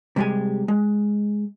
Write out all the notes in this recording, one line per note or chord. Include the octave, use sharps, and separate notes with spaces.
C3 G3 G#3 G4 G#5
G#3